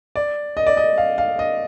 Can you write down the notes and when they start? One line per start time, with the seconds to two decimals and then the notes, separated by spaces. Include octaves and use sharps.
0.16 D5
0.57 D#5
0.67 D5
0.77 D#5
0.98 F5
1.18 F5
1.39 D#5